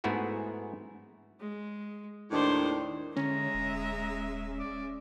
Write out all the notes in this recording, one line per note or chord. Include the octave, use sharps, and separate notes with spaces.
G#2 A3 B3 E4 F#4 G#4
G#3
D#2 A2 D#3 D4 C5 D5
D3 G#3 C#4 E5 A#5
D#1
D5